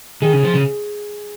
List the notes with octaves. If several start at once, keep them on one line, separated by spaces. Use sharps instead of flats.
D#3 G#4
C#3
F3
C#3